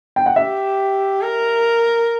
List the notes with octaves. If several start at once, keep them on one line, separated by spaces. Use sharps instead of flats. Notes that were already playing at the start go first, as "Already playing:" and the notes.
G5
F#5
G4 E5
A#4